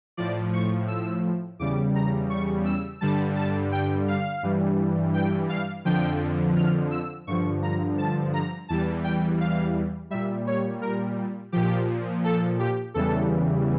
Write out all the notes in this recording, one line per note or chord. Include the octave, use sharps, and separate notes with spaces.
A2 F3 D5
C#6
E6
E2 C#3 G3 D6
A#5
C#6
E6
G2 D3 G3 A5
A5
G5
F5
G2 E3 G3
G5
F5
F2 D3 F3 G5
F6
E6
G2 D3 F3 C#6
A#5
A5
A#5
E2 E3 G3 A5
G5
F5
A#2 G3 E5
C#5
A#4
A#2 F3 G4
A4
G4
E2 C#3 E3 G3 A4